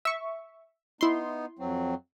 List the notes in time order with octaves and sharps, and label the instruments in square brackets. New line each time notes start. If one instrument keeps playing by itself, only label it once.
[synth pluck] E5 C#6
[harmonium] B3 D#4 [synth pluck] E4 C6
[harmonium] F2 F#3 C4